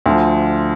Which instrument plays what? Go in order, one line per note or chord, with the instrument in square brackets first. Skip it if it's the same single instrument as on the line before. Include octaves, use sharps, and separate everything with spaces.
[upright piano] D2 D3 F3